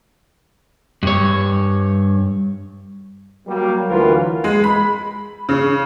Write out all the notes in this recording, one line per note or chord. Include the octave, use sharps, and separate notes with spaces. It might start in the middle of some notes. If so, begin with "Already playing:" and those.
G2 C#5
F#3 G3 A#3
D2 E3 F#3 F4 A#4 B4
G#3
B5
C#3